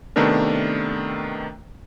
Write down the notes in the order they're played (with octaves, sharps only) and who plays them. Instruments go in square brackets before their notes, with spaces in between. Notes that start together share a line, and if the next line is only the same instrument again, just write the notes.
[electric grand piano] C3 D#3 A3 B3 D4 A#4